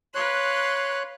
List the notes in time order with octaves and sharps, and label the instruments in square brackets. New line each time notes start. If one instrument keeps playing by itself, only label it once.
[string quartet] B4 F5 C6 [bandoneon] C#5 F#6